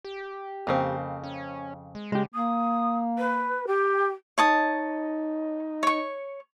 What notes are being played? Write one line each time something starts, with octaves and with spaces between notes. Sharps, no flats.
G4
F2 C#3 A#3 C4
C#4
G#3
C#3 G#3 G4
A#3 D#6
B4
G4
D#4 C#5 A5 D#6
C#5 C#6